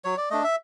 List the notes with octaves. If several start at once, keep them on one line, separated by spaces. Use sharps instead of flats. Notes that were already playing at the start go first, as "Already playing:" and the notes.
F#3 C#5
D5
A3 D4 D#5
E5